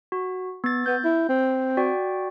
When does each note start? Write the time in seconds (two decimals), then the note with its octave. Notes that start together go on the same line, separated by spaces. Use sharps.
0.12 F#4
0.64 B3 A6
0.86 B3 G6
1.04 E4
1.29 C4
1.77 F#4 D5 G5